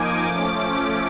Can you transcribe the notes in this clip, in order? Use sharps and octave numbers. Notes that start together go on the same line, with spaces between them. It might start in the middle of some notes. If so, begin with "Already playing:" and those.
Already playing: F3 A#3 D#4 G#5 D6
F3 A3 C#4